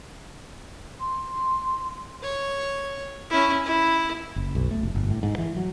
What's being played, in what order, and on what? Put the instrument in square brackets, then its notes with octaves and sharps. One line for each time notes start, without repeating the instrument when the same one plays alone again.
[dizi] C6
[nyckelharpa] C#5
C#4 E4
E4
[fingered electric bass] F#1
B1
A3
F1
G1
A2
G#2
E3
F#3